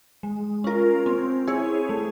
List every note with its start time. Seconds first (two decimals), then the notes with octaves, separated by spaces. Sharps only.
0.23 G#3
0.64 C#4 F4 A#4
1.06 C4
1.47 E4 G#4 C#5
1.89 A3